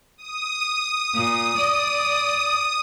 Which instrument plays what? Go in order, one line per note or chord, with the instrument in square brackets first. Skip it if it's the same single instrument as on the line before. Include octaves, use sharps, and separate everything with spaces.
[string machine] D#6
[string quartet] A#2
D5